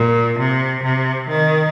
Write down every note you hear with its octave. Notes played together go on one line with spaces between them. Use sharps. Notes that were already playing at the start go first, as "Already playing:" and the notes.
Already playing: A#2
C3
C3
D#3